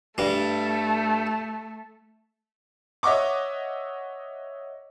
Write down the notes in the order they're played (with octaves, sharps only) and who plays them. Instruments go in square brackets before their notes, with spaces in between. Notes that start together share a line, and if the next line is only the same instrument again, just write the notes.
[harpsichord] G2 G3 [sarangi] A3
[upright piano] C#5 D#5 E5 F#5 C#6 D6